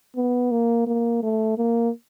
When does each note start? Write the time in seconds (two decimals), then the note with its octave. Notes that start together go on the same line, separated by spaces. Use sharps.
0.16 B3
0.51 A#3
0.87 A#3
1.22 A3
1.58 A#3